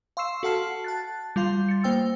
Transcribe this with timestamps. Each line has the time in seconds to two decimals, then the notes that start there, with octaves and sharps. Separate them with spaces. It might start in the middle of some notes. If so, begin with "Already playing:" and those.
0.17 F5 C6 C#6 E6 C7 E7
0.43 F#4 A4 F#5 A5 F6 C7
0.84 A5 F#6 A6
1.36 G3 F4 F5 C6 G6
1.69 A6 C#7
1.84 A#3 C5 G5 E6